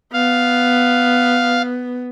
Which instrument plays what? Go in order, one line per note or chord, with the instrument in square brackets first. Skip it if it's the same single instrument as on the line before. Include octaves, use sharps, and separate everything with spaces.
[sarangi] B3 [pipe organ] F5